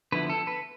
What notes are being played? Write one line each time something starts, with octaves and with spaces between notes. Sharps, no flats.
D3 F3 B3 E4 B4
A4
B4